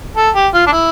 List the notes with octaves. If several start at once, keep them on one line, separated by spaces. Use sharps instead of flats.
A4
G4
F4
D4
E4